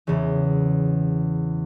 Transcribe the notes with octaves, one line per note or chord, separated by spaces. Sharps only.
E2 C#3 E3